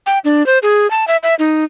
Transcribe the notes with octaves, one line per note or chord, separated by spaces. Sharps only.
G5
D4
C5
G#4
A5
E5
E5
D#4